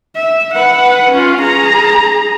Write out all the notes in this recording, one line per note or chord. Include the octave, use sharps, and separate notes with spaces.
E5
B4 F#5
C#4 F4
G#4 A#5